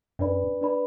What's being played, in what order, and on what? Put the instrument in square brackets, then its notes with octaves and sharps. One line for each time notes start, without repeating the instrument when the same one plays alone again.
[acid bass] F#2 [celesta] D4 B4 D5 B5
[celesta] D4 B4 D5 B5